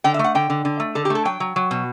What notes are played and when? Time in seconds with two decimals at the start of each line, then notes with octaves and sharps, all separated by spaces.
0.04 D3 G5
0.14 E5
0.19 A3
0.24 F#5
0.35 D3 G5
0.50 D3
0.65 D3
0.80 A3
0.95 D3 A4
1.05 G4
1.10 A3
1.15 A4
1.25 F#3 G5
1.40 F#3
1.56 F#3
1.71 B2